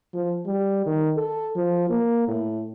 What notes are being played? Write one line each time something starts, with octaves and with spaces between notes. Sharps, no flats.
F3
G3
D#3
A4
F3
A#3
A2